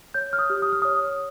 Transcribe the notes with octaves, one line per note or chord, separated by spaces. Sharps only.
C#5 G6
F6
D#6
G4
D#6
F6
C#5 D#6